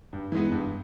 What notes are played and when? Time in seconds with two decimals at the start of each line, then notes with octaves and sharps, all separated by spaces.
0.13 G2
0.32 E3 G#3 B3
0.52 G2